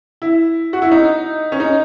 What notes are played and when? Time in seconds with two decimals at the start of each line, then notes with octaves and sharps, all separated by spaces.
0.22 E4
0.73 F#4
0.82 E4
0.91 D#4
1.52 C#4
1.60 D#4